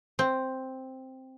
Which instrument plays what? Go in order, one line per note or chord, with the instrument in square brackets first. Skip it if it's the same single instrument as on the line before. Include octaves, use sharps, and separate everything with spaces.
[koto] C4